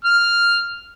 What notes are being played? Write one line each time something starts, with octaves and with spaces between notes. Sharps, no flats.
F6